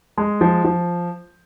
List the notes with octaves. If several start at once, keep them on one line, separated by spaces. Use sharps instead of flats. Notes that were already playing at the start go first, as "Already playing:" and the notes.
G#3
F3
F3